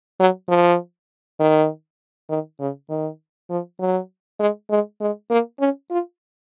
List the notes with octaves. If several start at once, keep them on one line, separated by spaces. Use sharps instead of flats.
F#3
F3
D#3
D#3
C#3
D#3
F3
F#3
G#3
G#3
G#3
A#3
C#4
F4